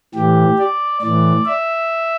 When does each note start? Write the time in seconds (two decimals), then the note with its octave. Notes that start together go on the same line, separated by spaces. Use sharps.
0.14 A2 E3 G4
0.58 D5
1.02 A2 E3 D5
1.46 E5